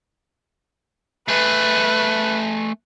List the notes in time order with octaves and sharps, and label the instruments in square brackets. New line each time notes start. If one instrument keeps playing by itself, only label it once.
[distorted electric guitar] A3 G#4 [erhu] B4